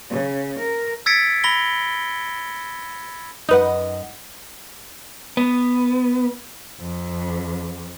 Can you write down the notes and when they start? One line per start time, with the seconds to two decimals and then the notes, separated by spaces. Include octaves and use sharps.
0.10 C#3
0.59 A#4
1.06 E6 G#6 A6 B6 C#7 D7
1.44 B5 A#6 G7
3.49 F#2 D#4 B4 D#5 F#5
5.37 B3
6.80 F2